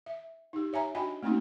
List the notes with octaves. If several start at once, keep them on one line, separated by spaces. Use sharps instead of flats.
E5
D#4 G4
C#5 E5 G#5 A#5
D4 F#4 D#5 G5 G#5 B5
A3 A#3 C4 C#4 D#4 F#4